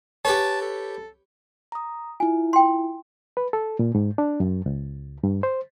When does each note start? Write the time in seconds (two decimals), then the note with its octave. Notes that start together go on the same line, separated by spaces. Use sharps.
0.25 G4 B4 C#5 A5
0.62 A4
1.72 A#5 D#6
2.20 E4 F4 G#5
2.53 G5 C6
3.37 B4
3.53 A4
3.79 A#2
3.95 G#2
4.18 D4
4.40 F#2
4.66 C#2
5.24 G2
5.43 C5